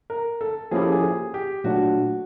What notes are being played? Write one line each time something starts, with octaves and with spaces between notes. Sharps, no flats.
A#4
A4
F3 A#3 C#4 E4 G4 G#4
A4
G#4
G#4
G4
A#2 F#3 A3 D4 F#4